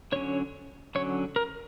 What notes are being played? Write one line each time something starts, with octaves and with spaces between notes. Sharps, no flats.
D3 F#3 C#4 C#5
D3 F#3 C#4 C#5
A#4